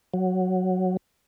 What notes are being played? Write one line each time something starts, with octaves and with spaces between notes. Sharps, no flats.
F#3